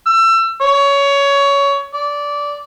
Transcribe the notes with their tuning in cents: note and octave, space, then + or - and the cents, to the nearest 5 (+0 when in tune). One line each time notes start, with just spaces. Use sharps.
E6 +30
C#5 +20
D5 -15